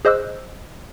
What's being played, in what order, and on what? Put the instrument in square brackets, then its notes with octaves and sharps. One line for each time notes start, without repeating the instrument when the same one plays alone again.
[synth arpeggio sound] G#4 C5 D#5 D6 E6 F#6